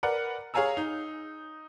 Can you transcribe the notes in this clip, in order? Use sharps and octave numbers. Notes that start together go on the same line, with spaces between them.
A#4 B4 D5 F#5
G#4 C#5 F5 G#5 A#5 E6
D#4